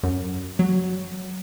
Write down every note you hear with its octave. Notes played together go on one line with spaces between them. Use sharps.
F#2
F#3